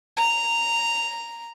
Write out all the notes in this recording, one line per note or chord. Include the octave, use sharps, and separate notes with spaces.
A#5